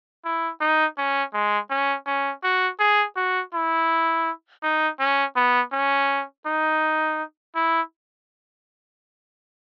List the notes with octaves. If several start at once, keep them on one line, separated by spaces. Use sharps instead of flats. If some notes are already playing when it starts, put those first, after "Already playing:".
E4
D#4
C#4
G#3
C#4
C#4
F#4
G#4
F#4
E4
D#4
C#4
B3
C#4
D#4
E4